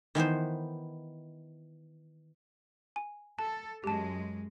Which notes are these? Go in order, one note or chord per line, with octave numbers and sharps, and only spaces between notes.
D#3 E3 B3 C5
G#5
A4 A5
F#2 G#3 G4 A5